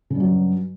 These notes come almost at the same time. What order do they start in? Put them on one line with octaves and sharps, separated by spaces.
C#3 G2 F#3